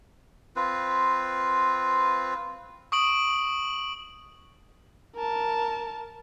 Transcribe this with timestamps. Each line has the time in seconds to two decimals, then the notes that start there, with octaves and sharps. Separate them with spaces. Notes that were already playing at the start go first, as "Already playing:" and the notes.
0.56 C4 F4 B4
2.92 C#6 D#6 D7 F#7
5.16 A#4 A5